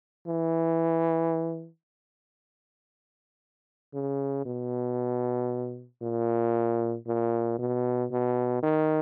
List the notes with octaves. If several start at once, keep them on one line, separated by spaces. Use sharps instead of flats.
E3
C#3
B2
A#2
A#2
B2
B2
D#3